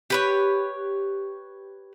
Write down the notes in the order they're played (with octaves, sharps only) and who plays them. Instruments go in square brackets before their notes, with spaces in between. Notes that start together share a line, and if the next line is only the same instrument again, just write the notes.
[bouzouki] G4 B4 C#5